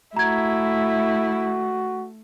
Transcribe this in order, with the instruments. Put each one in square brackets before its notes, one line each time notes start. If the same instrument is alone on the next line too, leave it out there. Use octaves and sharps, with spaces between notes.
[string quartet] A3 [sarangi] E4 [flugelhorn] F#4 [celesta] A#5 G#6